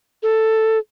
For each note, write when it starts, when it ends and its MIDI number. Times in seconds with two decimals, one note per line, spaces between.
0.23 0.78 69